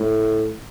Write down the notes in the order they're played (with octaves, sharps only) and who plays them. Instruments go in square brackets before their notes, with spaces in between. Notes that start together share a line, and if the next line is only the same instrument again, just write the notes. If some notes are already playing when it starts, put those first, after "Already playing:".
Already playing: [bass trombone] A2